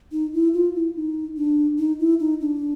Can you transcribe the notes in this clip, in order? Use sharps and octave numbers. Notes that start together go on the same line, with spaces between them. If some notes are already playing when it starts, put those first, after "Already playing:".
D#4
E4
F4
E4
D#4
D4
D#4
E4
D#4
D4